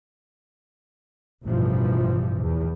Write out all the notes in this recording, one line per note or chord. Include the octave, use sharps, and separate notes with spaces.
A1 G2 B2 E3 F3
E2